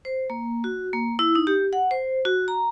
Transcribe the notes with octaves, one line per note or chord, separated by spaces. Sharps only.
C5
A#3
F#4
A#3
E4
D#4
G4
F#5
C5
F#4
A#5